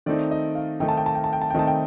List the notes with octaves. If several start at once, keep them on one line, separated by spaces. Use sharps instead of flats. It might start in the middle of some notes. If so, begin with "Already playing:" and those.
D#3 A3 C4 D#4 D5
D#5
F5
D#3 A3 C4 D#4 G5
A5
G5
A5
G5
A5
G5
A5
G5
D#3 A3 C4 D#4 A5
G5